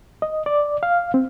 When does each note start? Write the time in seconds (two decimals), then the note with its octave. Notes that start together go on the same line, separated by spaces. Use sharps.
0.22 D#5
0.46 D5
0.83 F5
1.14 C4